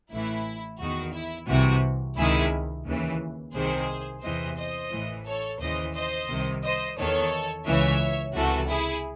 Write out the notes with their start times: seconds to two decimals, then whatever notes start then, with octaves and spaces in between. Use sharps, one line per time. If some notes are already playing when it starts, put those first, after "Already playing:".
0.11 A1 A2 E3 E4
0.80 E2 D#3 F#4
1.14 E4
1.48 C2 C3 E3 F#4
2.17 C#2 C3 D#3 E4 G#4
2.85 D#2 C#3 E3
3.54 C2 C3 D#3 G#4 C5
4.23 E2 C3 E3 C5 D#5
4.57 C5 D#5
4.91 A1 A2 E3
5.26 A4 C#5
5.60 D#2 C#3 E3 C5 D#5
5.94 C5 D#5
6.29 C2 C3 D#3
6.63 C5 D#5
6.97 E2 D#3 A4 C#5
7.66 C#2 C#3 E3 C#5 E5
8.34 C#2 C3 E3 F#4 A4
8.69 E4 G#4